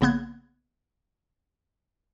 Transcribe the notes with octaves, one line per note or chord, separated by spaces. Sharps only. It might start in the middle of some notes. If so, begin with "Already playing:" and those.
A#1 C#3 A#3 B3 F#6 G#6